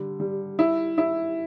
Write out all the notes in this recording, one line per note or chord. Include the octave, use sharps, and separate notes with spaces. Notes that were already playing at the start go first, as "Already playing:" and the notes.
Already playing: D3 G3
G3
E4
E4